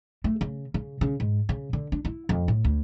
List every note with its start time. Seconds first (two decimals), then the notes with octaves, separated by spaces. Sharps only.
0.24 A3
0.41 C#3
0.74 C#3
1.01 C#3
1.20 G#2
1.49 C#3
1.73 D3
1.92 D4
2.05 E4
2.29 F2
2.48 A2
2.64 D2